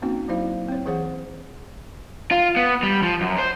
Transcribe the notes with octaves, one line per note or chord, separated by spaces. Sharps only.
A#3 C4 C#4 D#4 F#4
F#3 E4 C5 F5
C4 C#5
E3 G#4 C5 C#5 F#5
F4
B3
G3
F3
F#2
C5